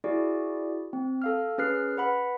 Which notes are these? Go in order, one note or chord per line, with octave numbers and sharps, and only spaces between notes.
E4 F#4 G#4 D5
C4
A4 F5 F6
C#4 G#4 B4 F6 F#6 C7
B4 F#5 B5